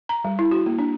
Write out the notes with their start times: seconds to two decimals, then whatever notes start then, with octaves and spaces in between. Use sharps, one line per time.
0.09 A#5
0.24 G3
0.39 E4
0.51 F#4
0.66 A#3
0.79 D4